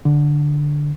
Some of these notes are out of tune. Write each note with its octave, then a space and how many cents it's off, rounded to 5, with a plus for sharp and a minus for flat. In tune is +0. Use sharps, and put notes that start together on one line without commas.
D3 +0